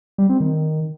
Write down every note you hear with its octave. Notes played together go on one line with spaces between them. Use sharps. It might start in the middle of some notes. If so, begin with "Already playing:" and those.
G3
C4
D#3